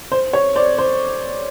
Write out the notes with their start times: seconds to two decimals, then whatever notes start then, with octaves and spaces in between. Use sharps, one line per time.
0.12 C5
0.33 C#5
0.56 C5 D5
0.78 C5